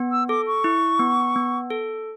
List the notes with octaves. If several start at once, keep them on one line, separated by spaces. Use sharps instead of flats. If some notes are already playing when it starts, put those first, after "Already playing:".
Already playing: B3
E6
A4 D6
C#6
E4
B3
B3
A4